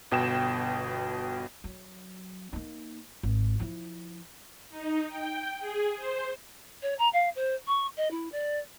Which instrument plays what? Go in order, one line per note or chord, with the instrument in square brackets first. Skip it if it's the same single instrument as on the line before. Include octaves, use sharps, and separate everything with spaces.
[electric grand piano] G1 B2 G5 E7
[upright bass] F#3
A#3 D#4
G#1
F3 E4
[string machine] D#4
G5
G#4
C5
[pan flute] C#5
A#5
F5
C5
C#6
D#5
E4
D5